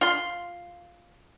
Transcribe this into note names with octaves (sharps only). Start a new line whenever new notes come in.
F4 C6